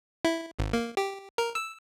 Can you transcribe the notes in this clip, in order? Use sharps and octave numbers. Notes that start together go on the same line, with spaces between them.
E4
G#1
A#3
G4
A#4
E6